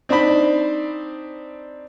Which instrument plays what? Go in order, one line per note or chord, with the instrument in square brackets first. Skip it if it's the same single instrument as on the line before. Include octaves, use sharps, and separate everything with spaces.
[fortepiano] C4 D4 D#4 C5 B5